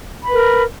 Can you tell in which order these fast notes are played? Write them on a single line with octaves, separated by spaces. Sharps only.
B5 B4 A#4